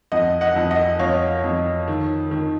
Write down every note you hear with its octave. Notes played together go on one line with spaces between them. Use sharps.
F2 D#5 F#5
D#5 F#5
F2
D#5 F#5
F2 C#5 F5
F2
D#3
D#3